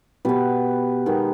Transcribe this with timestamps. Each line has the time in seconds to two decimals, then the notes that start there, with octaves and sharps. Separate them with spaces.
0.25 B2 B3 G4 B4
1.06 D#3 G#3 B3